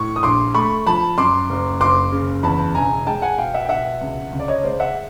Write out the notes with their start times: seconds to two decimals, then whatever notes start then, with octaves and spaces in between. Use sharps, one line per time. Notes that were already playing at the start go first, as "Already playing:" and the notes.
Already playing: A2 C#6
0.16 D#6
0.23 A#1 C6 D6
0.54 A3 B5 C#6
0.86 F3 A5 B5
1.18 F#2 C6 D6
1.50 F#1
1.80 F#1 C6 D6
2.12 C#3
2.43 E2 A5 B5
2.75 E1 G#5 A#5
3.07 G#3 G5 A5
3.22 F#5 G#5
3.38 B2 F5 G5
3.54 E5 F#5
3.65 G5
3.69 B2 E5 F#5
4.01 C#2
4.32 C#2
4.40 D5
4.48 C#5 D#5
4.64 G#3 C5 D5
4.80 E5 F#5